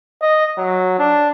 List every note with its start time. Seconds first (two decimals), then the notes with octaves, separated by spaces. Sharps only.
0.22 D#5
0.58 F#3
0.99 D4